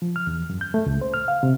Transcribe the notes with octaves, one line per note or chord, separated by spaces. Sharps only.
F3
F6
E2
F#2
G6
A3
C#2
C5
F6
F5
C3